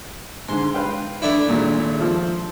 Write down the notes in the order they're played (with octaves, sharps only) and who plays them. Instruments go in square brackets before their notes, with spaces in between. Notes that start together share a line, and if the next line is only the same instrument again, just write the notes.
[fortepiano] G#2 D3 [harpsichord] C6
[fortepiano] B4 F5 G5
[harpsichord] A3 D4 E4
[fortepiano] G#1 A#2
F3